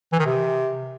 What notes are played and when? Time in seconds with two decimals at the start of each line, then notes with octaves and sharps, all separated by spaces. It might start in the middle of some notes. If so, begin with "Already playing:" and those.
0.12 E3
0.19 D#3
0.26 C3